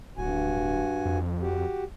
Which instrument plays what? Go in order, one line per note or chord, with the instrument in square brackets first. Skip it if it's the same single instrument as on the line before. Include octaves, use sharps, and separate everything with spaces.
[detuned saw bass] D1 [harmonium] G2 F#4 G#5
[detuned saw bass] F2
[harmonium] F#4 G4